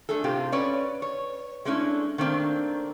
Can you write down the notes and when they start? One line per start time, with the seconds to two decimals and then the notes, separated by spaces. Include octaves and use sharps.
0.09 A3 D4 G#4 A4
0.24 A2 C3 C4 F4 G4
0.52 C#4 B4 C#5 D5
1.02 C#5
1.65 G#3 A3 C#4 D4 E4
2.18 D#3 A3 A#3 C4 D4